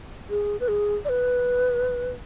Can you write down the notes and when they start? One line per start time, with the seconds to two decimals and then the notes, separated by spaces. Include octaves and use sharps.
0.30 G#4
0.60 B4
0.68 G#4
1.05 D5
1.09 B4